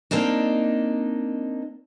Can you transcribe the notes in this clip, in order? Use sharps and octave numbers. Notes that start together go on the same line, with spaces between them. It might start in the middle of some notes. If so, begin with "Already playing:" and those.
A#3 C4 D4 D#4